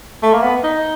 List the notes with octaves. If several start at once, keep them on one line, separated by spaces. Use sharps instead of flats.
A3
A#3
B3
D#4